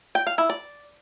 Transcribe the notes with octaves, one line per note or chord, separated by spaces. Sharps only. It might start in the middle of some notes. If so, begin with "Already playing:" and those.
G5
F5
E4
D5